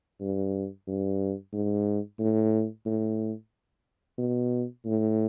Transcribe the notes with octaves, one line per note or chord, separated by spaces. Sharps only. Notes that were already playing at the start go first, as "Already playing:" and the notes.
G2
G2
G#2
A2
A2
B2
A2